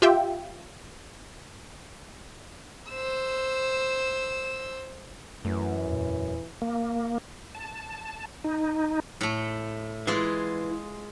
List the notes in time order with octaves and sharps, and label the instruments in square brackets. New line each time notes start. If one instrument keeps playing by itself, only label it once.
[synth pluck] F4 G4 E5 G5
[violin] C5 E6
[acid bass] F#2 [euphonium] E3 [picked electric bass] A3
[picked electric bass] E2 A#2
[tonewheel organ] A#3
A5
D#4
[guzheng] A2 A3
[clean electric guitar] E3 [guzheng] G#3 F4 G#4